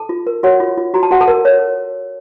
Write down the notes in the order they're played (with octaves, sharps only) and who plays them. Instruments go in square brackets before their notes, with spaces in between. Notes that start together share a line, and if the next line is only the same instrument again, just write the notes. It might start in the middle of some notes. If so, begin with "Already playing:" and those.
Already playing: [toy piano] A4 A5
F4
A#4
F#4 C#5 F#5
F4
F4
F#4 A#5
A5
F#4 F#5
A4 A5
A#4
C#5